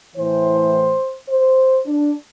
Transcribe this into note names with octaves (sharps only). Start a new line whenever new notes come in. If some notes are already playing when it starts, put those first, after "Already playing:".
A2 E3 C5
C5
D4